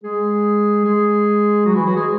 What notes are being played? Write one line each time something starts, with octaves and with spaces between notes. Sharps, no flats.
G#3 G#4
G#3 G#4
F#3 F#4
E3 E4
F#3 F#4
G#3 G#4